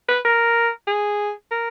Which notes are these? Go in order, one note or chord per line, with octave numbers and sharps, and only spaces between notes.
B4
A#4
G#4
A#4